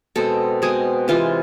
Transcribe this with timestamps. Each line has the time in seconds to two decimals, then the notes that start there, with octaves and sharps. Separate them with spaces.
0.16 B2 G#3 C4 A4
0.62 B2 G#3 C4 G#4
1.08 C3 E3 G#3 F4